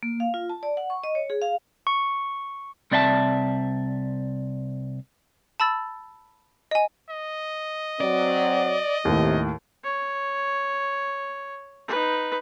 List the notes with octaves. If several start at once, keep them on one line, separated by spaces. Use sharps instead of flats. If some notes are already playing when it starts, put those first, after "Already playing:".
A#3
F5
F4
A5
D5
F#5
C#6
D#5
C#5
G#4
F5
C#6
C2 C4 D5 E5 G5 A5
A5 B5 E6 A6
D#5 G#5
D#5
F#3 C4 D5
D#2 A2 C3 D#3
C#5
D#4 B4